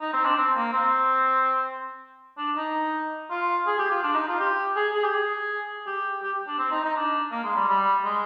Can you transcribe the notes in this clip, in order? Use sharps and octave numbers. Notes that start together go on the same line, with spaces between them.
D#4
C4
D4
C4
A#3
C4
D4
D#4
F4
G#4
G4
F4
D4
D#4
F4
G4
G#4
G#4
G4
G#4
G4
G4
D4
C4
D#4
D#4
D4
A#3
G#3
G3
G3
G#3